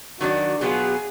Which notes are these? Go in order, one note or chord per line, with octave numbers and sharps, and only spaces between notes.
D#3 F#3 D4 F#4
B2 F#3 B3 F4 G#4